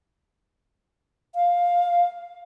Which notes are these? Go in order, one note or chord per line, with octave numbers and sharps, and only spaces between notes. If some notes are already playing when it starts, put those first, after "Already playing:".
F5